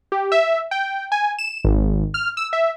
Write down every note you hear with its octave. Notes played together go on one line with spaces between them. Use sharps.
G4
E5
G5
G#5
E7
G#1
F6
E6
E5